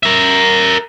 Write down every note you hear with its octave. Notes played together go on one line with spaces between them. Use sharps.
A#4 E5